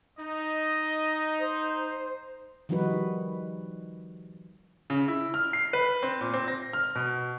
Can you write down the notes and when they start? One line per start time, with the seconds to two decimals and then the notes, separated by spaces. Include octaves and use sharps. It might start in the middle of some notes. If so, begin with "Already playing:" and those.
0.18 D#4 D#5
1.39 C5
2.69 D#3 F3 G3 D#4 F#4 B4
4.90 C#3
5.08 E4
5.34 F6
5.53 C7
5.73 B4
6.03 C4
6.21 A#2
6.34 C4
6.48 A#6
6.73 F6
6.95 B2